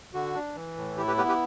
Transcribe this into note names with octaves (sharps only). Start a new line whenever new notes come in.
D3 F#4
D4
E3
A2
E4 G4
G4 B4
B3 G4 B4
G4 B4